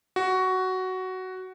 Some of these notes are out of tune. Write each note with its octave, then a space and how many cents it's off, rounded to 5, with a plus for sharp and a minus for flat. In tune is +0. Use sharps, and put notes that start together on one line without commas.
F#4 +10